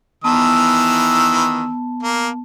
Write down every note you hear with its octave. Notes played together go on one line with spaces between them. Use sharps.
D#3 E3 B3 A5 E6
A#3